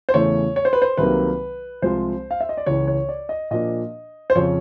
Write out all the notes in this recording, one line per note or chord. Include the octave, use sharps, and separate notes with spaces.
C5
E2 C#3 E3 A3 C#5
C#5
C5
B4
C5
C2 C3 D#3 F#3 A#3 B4
C2 C3 F3 G#3 C5
F5
E5
D#5
D5
C#2 C#3 E3 C#5
C#5
D5
D#5
A#2 F3 A#3 D4 D#5
C5
F2 C#3 F3 C#5